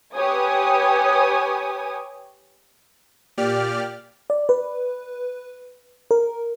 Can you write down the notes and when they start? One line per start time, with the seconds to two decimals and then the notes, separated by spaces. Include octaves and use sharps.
0.14 G4 B4 C#5 G#5 D#6
3.37 A#2 G4 D5 F6
4.30 D5
4.49 B4
6.11 A#4